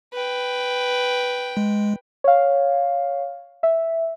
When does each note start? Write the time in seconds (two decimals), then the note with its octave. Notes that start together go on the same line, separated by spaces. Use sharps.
0.13 B4 G5
1.57 G#3
2.24 C#5 F5
3.63 E5